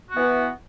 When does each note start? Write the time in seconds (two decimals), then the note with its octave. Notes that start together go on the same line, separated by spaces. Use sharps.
0.10 F#4
0.14 B3
0.17 E3